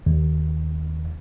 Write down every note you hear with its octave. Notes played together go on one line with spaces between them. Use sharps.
D#2